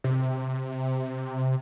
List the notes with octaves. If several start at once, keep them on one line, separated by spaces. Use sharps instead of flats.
C3